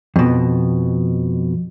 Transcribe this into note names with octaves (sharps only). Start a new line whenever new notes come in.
F2 B2